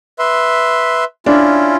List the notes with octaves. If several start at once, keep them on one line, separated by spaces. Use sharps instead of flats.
B4 E5 C6
C#4 D4 E4 F4